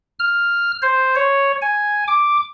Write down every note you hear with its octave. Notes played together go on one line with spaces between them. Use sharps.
F6
C5
C#5
G#5
D6